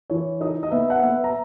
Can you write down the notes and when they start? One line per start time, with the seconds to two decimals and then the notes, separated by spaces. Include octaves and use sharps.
0.10 E3 C#5
0.41 D#4 D#5
0.63 D#5
0.71 B3 E5
0.90 F#5
1.03 B3 E5
1.24 A#5